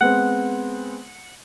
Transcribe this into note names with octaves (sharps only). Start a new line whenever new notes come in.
G#3 B3 C4 F#5